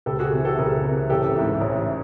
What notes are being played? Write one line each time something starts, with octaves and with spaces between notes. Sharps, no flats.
C#2 G4 A4
F#4 G#4
C3 E3
G4 A4
C#2 G#4 A#4
C3 E3
A1 G4 A4
G#2 E3
A1